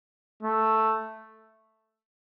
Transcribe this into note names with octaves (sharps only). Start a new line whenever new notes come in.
A3